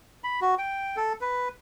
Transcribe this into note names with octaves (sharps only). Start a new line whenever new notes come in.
B5
F#4
G5
A4
B4